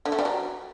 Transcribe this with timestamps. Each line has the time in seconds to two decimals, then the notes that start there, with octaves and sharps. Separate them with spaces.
0.05 D3
0.12 A3
0.19 G3
0.25 F#3